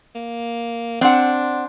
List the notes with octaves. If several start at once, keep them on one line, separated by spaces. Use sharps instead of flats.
A#3
C4 D4 F#5